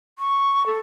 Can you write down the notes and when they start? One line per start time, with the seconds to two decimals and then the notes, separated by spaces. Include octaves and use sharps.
0.19 C#6
0.66 A4